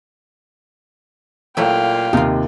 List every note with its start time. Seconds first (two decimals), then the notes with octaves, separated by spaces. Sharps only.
1.57 A#2 F#3 A3 E4 F5 G5
2.13 D#2 C3 D#4 F4